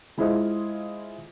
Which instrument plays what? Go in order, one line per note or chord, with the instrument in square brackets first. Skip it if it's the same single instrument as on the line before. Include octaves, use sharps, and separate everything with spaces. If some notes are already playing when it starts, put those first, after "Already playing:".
[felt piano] G#3 E4 F4 G#4 C5 D#5